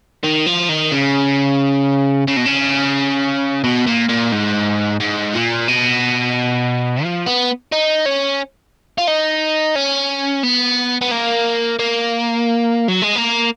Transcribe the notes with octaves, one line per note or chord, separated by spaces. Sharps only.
D#3
F3
D#3
C#3
C#3
B2
C#3
B2
A#2
A#2
G#2
G#2
A#2
B2
F3
B3
D#4
C#4
F4
D#4
C#4
B3
B3
A#3
A#3
F#3
G#3
A#3